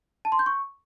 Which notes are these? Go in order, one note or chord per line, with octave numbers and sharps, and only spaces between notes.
A5
C6
G6
C#6